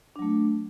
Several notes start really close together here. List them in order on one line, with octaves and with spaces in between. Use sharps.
D4 F#3 A3